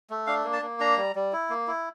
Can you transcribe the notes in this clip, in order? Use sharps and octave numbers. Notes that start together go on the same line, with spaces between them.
A3
D4 F5
A#3
A5
A#3
D4 A#5
G3
G3
E4
A#3
E4